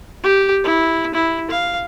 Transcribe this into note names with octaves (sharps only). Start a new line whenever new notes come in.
G4
E4
E4
F5